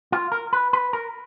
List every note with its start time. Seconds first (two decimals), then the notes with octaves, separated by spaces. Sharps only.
0.12 F4
0.32 A#4
0.53 B4
0.73 B4
0.93 A#4